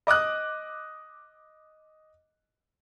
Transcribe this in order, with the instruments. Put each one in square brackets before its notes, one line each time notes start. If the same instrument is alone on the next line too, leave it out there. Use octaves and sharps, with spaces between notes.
[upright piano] D#5 D6 D#6 F#6